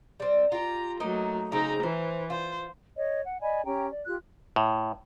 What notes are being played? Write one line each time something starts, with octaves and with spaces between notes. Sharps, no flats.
G3 C4
F4 G4 A#5
F#3 A3 A#3 D#4 D#5
C#3 C4 D#4 A#5
E3 C5
F4 C5
C#5 D#5
F#5
D5 D#5 G#5 B5
C#4 G4 G5 A#5
D5
F4 G4 F#6
A2